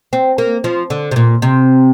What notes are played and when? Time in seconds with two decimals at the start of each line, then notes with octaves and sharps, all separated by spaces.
0.13 C4
0.38 A#3
0.64 F3
0.90 D3
1.11 C3
1.16 A#2
1.42 C3